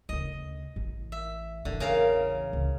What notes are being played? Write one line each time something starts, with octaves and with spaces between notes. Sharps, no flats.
D2 C#3 D#5
A1
E5
A1 E2 D3
C#3 A#4 F5
C#2